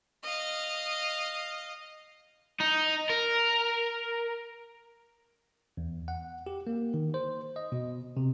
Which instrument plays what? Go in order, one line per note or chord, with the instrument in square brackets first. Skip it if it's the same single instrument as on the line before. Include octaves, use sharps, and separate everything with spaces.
[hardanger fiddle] D#5 F5
[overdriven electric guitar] D#4
A#4
[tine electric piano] E2
F#5
G4
A#3
D#3
C5
D#5
B2
C3